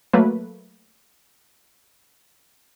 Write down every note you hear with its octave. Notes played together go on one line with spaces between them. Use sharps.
F#3 A3 A#3 B4